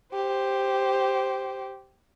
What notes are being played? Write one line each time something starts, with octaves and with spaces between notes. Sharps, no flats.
G4 C5